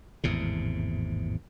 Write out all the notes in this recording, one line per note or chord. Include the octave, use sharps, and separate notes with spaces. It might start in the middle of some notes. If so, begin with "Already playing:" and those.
G#1 E2 A2 C3